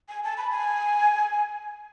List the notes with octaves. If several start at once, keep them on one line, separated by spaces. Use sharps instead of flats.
G#5
A5
B5
G#5